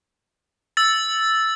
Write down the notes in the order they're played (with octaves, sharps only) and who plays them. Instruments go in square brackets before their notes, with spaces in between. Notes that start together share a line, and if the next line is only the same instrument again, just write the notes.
[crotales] E6 A6